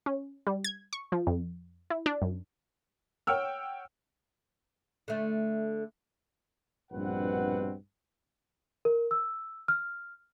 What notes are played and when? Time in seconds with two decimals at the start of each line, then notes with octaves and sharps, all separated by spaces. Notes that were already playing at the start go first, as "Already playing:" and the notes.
0.06 C#4
0.47 G3
0.64 G#6
0.93 C#6
1.12 F3
1.27 F2
1.90 E4
2.06 D4
2.22 F#2
3.27 C#5 F#5 G5 E6 F6
5.08 D3 A3
6.92 A#1 G2 B2 C4 B4 F#5
8.85 A#4
9.11 E6
9.68 F6